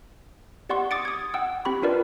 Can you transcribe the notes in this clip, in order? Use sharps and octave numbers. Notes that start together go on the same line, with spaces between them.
G4 D5 F#5 C6 C#6
D6 D#6 A6 C#7 D7
D#6 G#6
F#5 G5 E6
C4 G4 B5 C#6
D4 F4 A#4 B4 D5